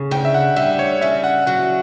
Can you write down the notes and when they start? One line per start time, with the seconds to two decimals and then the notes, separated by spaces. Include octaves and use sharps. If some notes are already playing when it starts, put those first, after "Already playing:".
Already playing: C#3
0.11 D2 G5
0.25 E5
0.34 F#5
0.56 G3 E5
0.79 C#5
1.01 C#3 E5
1.24 F#5
1.47 F#3 F#5